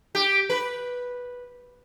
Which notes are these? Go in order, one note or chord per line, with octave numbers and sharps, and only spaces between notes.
G4
B4